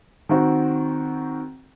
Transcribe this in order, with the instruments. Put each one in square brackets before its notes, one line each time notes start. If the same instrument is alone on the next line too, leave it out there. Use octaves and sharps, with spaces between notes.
[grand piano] D#3 C4 F#4